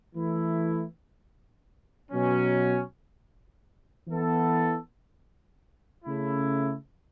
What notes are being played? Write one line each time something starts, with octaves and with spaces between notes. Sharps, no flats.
E3 A3 E4
B2 F#3 C#4
E3 B3 A4
C#3 A3 E4